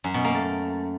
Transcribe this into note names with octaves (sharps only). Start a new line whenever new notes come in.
F#2
B2
A#3
A3